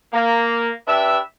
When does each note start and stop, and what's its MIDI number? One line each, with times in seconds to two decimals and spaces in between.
0.13 0.69 58
0.87 1.18 62
0.87 1.18 67
0.87 1.18 71
0.87 1.18 76